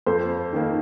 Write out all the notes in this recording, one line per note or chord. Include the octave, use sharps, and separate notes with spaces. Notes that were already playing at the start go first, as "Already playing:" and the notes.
F2 C5
D#3 A#3